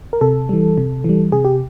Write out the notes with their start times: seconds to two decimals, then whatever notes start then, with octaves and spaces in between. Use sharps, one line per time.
0.13 A#4
0.21 C3 A4
0.49 E3 G3
0.78 C3
1.04 E3 G3
1.32 C3 G#4
1.45 G4